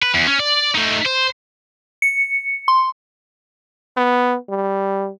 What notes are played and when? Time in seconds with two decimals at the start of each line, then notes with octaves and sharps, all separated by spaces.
0.02 B4
0.14 E2
0.27 C#4
0.39 D5
0.75 A3 D#4
1.05 C5
2.02 C#7
2.68 C6
3.97 B3
4.49 G3